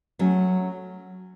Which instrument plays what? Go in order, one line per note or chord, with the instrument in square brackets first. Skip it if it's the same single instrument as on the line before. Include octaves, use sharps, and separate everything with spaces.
[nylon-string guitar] F#3 A3 C#4